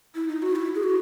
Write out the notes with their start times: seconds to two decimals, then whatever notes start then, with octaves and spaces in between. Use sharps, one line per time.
0.15 E4
0.28 D#4
0.42 F#4
0.56 E4
0.75 G#4
0.83 F#4